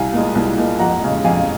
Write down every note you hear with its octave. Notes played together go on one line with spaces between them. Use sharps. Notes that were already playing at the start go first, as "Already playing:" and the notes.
Already playing: C2 F5 G#5
A#2 G#3
C2
A#2 G#3
F2 F#5 A#5
C#3 G#3
F2 F5 G#5